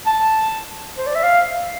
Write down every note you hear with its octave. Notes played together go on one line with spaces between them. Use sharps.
A5
C5
D5
E5
F5